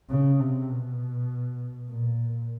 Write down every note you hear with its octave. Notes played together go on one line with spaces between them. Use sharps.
C#3
C3
B2
A#2